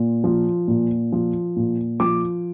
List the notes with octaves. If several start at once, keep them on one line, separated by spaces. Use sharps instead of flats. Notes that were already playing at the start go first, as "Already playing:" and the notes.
Already playing: A#2
F3
A#2
F3
A#2
F3 D6